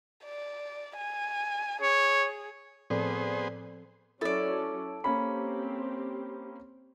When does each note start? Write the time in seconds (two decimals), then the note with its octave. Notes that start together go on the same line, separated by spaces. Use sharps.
0.24 D5
0.97 G#5
1.82 G#4 C#5
2.90 A2 F3 B3 C4 G#4 A4 C5 D5
4.21 F#3 C#4 E4 A4 D5
5.04 A#3 C4 C#4 G4 B5